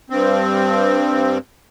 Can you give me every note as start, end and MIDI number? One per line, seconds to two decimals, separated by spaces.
0.10 1.38 43
0.10 1.38 60